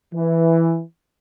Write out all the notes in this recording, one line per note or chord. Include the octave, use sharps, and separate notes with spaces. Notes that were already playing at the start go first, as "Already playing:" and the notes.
E3